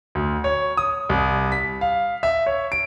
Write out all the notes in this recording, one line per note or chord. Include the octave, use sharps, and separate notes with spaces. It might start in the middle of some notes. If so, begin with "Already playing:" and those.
D2
C#5
D#6
C2
B6
F5
E5
C#5
D7